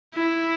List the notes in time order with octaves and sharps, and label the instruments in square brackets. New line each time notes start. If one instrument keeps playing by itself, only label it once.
[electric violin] E4